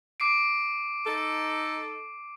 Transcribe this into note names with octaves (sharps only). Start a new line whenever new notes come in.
D6 C7 D7
D#4 A4